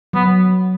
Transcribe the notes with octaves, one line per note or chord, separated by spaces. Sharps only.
F#3 B3